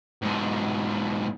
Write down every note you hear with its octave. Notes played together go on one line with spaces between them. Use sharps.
G#2 B2